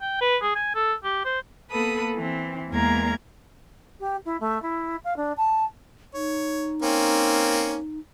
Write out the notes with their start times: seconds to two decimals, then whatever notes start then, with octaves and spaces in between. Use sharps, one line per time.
0.02 G5
0.21 B4
0.42 G#4
0.56 G#5
0.75 A4
1.04 G4
1.25 C5
1.70 A#3 B3 A4 B4 B5 D#6
2.16 E3 C4
2.71 E2 G#3 A#3 A#4 A#5 G#6
4.00 G4
4.25 E4
4.40 A3
4.62 E4
5.04 F5
5.16 D4
5.37 A5
6.14 D#4 C#5
6.83 A#3 C4 C#4